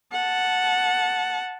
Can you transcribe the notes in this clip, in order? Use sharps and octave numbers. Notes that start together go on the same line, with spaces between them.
F#5 A5